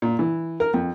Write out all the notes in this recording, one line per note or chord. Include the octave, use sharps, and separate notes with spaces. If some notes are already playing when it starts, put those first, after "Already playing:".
A#2
E3
A#4
F2